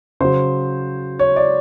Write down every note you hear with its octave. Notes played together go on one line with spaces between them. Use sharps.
C#3 F#3 C5
C#5
D5